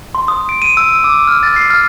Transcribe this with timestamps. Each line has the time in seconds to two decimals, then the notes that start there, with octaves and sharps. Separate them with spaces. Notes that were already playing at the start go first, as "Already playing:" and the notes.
0.15 C6
0.28 D#6
0.49 D7
0.62 D#7
0.77 E6
1.04 D6
1.27 F6
1.43 A6
1.56 C7
1.70 F6